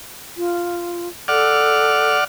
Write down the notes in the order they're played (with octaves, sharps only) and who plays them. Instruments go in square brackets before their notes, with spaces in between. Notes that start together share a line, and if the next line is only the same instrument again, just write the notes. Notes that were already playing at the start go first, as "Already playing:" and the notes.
[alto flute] F4
[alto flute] A4 [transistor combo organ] D5 F#5 F6